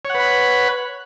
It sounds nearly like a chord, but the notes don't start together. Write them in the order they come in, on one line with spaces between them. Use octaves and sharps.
C#5 F#5 B4 B5